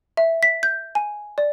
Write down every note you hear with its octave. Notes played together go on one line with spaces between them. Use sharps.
E5
B6
G6
G#5
D5